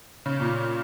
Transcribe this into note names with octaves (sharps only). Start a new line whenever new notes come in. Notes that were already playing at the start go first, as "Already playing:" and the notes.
C#3
A#2